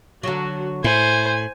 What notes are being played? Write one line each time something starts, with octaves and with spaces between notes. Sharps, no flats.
D3 F#3 F#4
A2 E4 C5 G#5